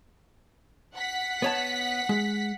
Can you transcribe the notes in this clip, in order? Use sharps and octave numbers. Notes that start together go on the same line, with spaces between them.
F#5 B6
B3 C#5 A5
G#3